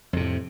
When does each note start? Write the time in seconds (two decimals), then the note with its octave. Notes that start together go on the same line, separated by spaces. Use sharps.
0.13 F2
0.17 C3
0.20 A2